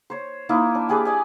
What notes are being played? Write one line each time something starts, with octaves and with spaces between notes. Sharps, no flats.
C5 C#5
A#3 D#4 E4 D#5
D4
G4 G#4 B4 D5
D5 D#5 G#5